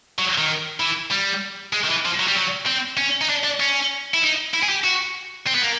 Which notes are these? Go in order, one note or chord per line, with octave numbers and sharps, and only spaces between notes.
F#3
D#3
E3
G3
G#3
D#3
E3
F3
F#3
G3
F#3
C4
C#4
D#4
D4
D4
C#4
E4
D#4
E4
G#4
G4
F#4
C4
B3
A#3